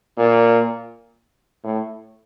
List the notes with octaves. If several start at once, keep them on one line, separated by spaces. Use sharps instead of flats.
A#2
A2